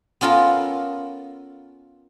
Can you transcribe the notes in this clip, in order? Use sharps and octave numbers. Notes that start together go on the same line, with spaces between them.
B3 C#4 F4 A4 A#4